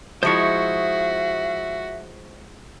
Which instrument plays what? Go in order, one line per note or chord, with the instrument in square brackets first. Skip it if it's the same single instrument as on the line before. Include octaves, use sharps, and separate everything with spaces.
[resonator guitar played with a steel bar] F3 G#3 E4 [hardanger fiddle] F#4 [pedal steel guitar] C5 C#6 [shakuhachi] E5